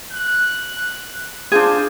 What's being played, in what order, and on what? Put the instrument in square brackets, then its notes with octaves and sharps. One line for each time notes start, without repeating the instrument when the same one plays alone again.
[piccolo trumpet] F#6
[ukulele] D4 F4 G#4 [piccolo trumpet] C5